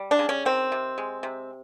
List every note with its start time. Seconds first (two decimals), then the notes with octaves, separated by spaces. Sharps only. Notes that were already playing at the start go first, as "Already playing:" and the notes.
Already playing: G3
0.11 D4
0.19 C#3
0.29 C#4
0.45 D#3 C4
0.72 C3
0.98 G#3
1.23 C3